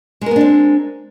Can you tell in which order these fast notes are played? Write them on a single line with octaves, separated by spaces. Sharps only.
G#3 A#4 B3 D4 C4